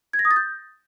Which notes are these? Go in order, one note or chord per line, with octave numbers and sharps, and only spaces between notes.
G#6
A#6
D#6
A6
G6